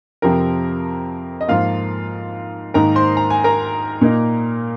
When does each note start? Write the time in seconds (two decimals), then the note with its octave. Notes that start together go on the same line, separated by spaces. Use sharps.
0.22 F2 C3 F3 C4 A#4
1.41 D#5
1.48 G#2 F3 A#3 F4 F5
2.74 G#2 D#3 A#3 D#4 A#4 A#5
2.96 C5 C6
3.17 A#5
3.30 G#5
3.44 A#4 A#5
4.01 A#2 A#3 D#4